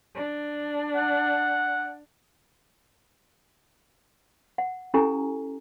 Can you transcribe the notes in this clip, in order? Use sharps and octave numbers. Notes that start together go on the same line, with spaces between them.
D4
F#5
F#5
C#4 E4 G4 A4 G#5 A#5